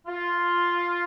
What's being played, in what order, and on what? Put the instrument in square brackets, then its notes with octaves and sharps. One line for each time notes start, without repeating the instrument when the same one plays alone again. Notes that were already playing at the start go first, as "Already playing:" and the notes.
[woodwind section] F4